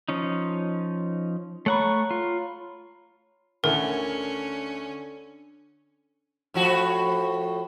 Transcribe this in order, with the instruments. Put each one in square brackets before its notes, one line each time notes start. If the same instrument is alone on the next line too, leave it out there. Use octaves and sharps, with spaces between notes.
[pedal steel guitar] F3 C#4 D#4
[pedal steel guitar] A3 F#5 C#6 [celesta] C#5 A#5 B5
[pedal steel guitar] F4
[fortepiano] D2 E4 A4 [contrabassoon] D3 [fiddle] C#4 [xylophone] A#4
[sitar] A2 F3 F#4